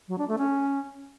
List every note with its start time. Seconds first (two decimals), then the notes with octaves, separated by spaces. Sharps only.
0.08 F#3
0.18 D4
0.28 A3
0.38 C#4